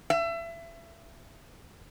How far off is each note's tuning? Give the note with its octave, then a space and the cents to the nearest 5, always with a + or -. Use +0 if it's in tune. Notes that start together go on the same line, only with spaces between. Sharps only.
E5 +30